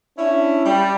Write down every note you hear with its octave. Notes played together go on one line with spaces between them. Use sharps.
C#4 D4 E4
G3